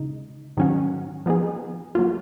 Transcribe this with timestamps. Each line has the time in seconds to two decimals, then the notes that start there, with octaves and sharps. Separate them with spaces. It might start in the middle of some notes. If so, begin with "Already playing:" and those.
Already playing: C#3 G#3 D#4
0.57 G#2 D#3 F#3 C#4 F#4
1.26 F3 B3 D#4 G#4
1.95 F#3 A#3 F4